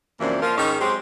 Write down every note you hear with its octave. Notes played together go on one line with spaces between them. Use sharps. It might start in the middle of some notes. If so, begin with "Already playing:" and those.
F#2 C3 E3 F3 A#3 D4
F3 A#3 F4 A#4
G#2 D#3 C#4 D#4
F#3 G#3 C4 G4